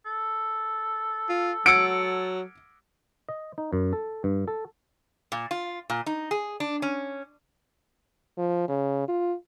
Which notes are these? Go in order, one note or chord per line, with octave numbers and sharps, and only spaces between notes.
A4
F4
F#3 F#5 E6 C#7 D7
D#5
D#4
F#2
A4
G2
A4
A#2
F4
A#2
D#4
G#4
D4
C#4
F3
C#3
F4